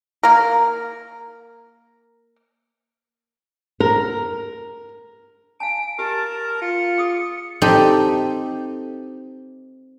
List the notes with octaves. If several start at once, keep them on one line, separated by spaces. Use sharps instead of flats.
A#3 A#4
A#4
F5 G#5 A5 D7
G4 A#4 A5
F4 C#7
G#4 D#6
C4 D#4 G4 A4